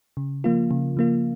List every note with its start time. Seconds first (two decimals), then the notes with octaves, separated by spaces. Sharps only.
0.17 C#3
0.44 F3 A#3 F4
0.71 C#3
0.97 F3 A#3 F4